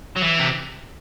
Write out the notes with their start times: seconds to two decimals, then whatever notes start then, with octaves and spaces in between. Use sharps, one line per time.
0.16 F#3
0.22 E3
0.39 C3